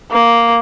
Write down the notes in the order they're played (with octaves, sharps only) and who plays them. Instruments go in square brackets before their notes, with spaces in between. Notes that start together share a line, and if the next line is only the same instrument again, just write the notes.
[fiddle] A#3